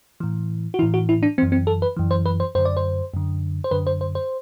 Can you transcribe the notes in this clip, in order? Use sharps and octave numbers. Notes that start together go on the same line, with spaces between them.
A2 E3
F#4
A2 E3 E4
F#4
E4
D4
F#2 E3 C4
C4
A4
B4
F#2 E3
C5
B4
C5
F#2 D3 C5
D5
C5
F#2 D3
C5
F#2 D3 B4
C5
C5
C5